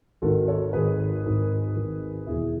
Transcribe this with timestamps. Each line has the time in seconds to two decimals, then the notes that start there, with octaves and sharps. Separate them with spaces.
0.22 G#1 G#2 D#3 F#4 A4
0.48 A4 C#5
0.73 G#1 G#2 D#3 G#4 B4
1.24 G#1 G#2 D#3
1.76 G#1 G#2 D#3
2.27 E1 E2 D#3 E4 G#4